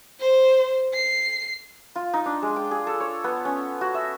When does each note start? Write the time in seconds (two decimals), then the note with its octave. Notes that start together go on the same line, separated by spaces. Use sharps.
0.20 C5
0.94 C7
1.96 F4
2.14 D#4
2.26 D4
2.42 G#3
2.56 G5
2.71 G#4
2.87 A4
3.00 C#5
3.24 B3
3.45 C#4
3.81 F#4
3.94 E5